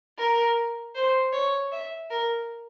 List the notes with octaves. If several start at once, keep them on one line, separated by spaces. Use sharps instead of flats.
A#4
C5
C#5
E5
A#4